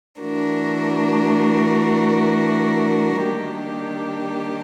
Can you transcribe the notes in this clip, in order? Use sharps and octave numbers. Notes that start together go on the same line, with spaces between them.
E3 A3 D4 F#4 A#4
D#3 G3 A#3 D4 G4